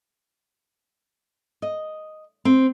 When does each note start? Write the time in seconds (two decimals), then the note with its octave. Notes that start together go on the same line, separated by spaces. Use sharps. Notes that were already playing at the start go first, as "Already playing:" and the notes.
1.62 D#5
2.45 C4